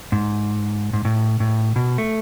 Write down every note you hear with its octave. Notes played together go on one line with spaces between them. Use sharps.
G#2
G#2
A2
A2
B2
A3